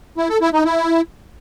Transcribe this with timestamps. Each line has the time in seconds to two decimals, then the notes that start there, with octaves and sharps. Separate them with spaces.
0.17 E4
0.29 A4
0.41 E4
0.53 D#4
0.65 E4